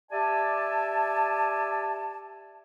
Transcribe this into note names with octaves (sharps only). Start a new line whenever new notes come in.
G4 D5 E5 G#5 A5